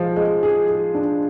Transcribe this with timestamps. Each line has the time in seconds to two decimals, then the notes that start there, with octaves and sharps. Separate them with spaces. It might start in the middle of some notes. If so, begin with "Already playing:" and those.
Already playing: F3 G#3
0.16 G#3
0.43 G#4
0.69 G#4
0.94 D4